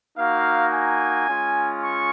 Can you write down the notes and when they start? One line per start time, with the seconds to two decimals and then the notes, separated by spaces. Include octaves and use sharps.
0.17 A#3 D#4 F#4 F5
0.73 G#5
1.28 G#3 C#4 F4
1.82 C#6